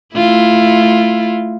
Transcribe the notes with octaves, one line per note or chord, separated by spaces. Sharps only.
A3 E4 F4